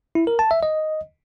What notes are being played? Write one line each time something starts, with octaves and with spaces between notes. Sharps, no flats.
E4
A#4
A5
E5
D#5